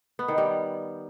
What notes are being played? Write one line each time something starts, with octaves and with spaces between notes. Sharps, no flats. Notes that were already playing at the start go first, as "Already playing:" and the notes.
B3
D#3
G3